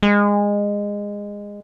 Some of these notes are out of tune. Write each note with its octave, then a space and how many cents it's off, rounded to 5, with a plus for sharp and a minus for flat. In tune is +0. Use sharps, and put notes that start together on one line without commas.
G#3 -20